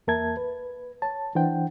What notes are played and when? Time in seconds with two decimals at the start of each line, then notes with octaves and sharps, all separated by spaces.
0.07 E2 A#3 A#4 E5 A5 G#6
0.37 B4
1.02 C#5 A5
1.35 E3 D4 C5 F#5 G5